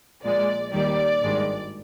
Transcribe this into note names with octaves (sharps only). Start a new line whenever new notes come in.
A#1 A#2 G#3 D5
D#2 D#3 G3 D5
G#1 G2 D#3 G#3